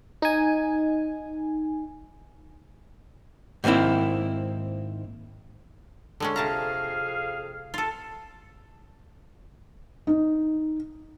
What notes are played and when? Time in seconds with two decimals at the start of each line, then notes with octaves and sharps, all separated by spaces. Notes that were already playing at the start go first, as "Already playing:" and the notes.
0.22 D#4 G#5
3.64 G#2 D#3 A#3 C4 E4
6.20 D3 G#3 C#4
6.36 F2 C3 G#4 F5 A5 A#5
7.74 F4 A4
10.07 D#4